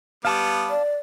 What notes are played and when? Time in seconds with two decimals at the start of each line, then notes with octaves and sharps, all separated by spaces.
0.25 G3 B3 F5 A5 D6
0.70 D5